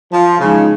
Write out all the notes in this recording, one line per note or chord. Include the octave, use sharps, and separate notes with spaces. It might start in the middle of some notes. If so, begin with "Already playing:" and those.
F3
C#3 F3 G#3 D#4